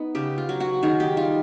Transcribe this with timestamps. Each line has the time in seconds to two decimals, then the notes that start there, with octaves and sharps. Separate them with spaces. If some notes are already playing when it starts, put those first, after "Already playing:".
Already playing: B3 D#4
0.15 C#3 G4
0.38 F4
0.49 F#3
0.60 F#4
0.83 D#3 G#4
1.00 G4
1.17 G3 F4